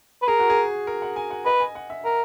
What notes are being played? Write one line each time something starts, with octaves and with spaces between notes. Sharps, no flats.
B4
G#4 A#4
F#4
G#4
A#4
F#5
G#5
F#5
B4 D#5
G#5
F#5
E5
A#4 F#5